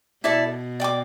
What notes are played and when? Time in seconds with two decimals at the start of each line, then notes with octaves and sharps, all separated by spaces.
0.24 B2 E4 A4 D5
0.80 D5 G5 D6